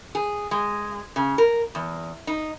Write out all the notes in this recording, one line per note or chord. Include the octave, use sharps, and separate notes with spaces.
G#4
G#3
C#3
A#4
E2
D#4